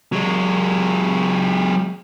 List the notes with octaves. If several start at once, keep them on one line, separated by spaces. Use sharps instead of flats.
F#3 G#3